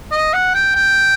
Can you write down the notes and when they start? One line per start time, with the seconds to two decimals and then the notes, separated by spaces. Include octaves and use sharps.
0.12 D#5
0.33 F#5
0.54 G5
0.75 G5